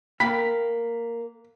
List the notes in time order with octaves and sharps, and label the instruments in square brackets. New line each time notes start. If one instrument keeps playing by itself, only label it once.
[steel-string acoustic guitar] A#3 [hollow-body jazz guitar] A#4 G5 B5 [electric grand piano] B6